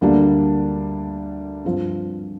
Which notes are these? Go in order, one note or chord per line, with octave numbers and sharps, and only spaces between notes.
D2 D3 G3 A#3 D4
G2 F3 C4 F4